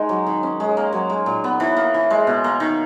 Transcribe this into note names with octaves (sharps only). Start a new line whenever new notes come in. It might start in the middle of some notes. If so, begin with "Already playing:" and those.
Already playing: G#3 D#4
F#3
D#3
C#4
G#3
A#3
F#3
G#3
A#2
B3
E3
A#3
E3
G#3
B2
A#3
D#3